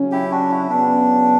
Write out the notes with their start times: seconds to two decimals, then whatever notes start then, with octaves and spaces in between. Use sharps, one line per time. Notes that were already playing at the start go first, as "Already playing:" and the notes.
Already playing: C#3 F#3 C#4
0.12 E4 G4
0.31 D4 F#4
0.51 E4
0.70 C#3 F#3 B3 D4